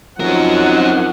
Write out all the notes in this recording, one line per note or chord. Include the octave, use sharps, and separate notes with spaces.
F3 F#3 C4 C#4 D#4 A#4 F#5